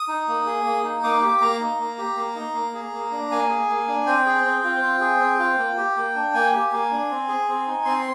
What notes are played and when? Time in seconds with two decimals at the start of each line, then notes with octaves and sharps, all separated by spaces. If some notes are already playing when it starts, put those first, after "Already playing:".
Already playing: D#6
0.08 D#4
0.28 A#3
0.46 G#4
0.65 A#3
0.84 D#4
1.03 A#3 D6
1.22 G4
1.41 A#3 A#5
1.60 D#4
1.79 A#3
1.98 G4
2.17 A#3
2.35 D#4
2.54 A#3
2.74 G#4
2.93 A#3
3.12 D4
3.31 A#3 G#5
3.49 G#4
3.69 A#3
3.88 D4
4.06 C4 G5
4.26 G#4
4.44 C4
4.64 F4
4.82 C4
5.01 G#4
5.20 C4
5.39 F4
5.58 A#3
5.77 G4
5.96 A#3
6.15 D4
6.34 A#3 G#5
6.53 G4
6.72 A#3
6.91 D4
7.10 C4
7.28 G#4
7.48 C4
7.67 D#4
7.85 C4 C6